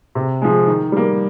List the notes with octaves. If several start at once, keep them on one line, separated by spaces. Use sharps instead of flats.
C3
F3 G#3
D#3
G3 A#3